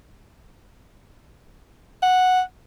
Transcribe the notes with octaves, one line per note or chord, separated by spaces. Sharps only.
F#5